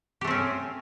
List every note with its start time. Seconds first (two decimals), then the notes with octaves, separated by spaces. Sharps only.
0.21 G4
0.24 A3
0.27 C4
0.31 C#4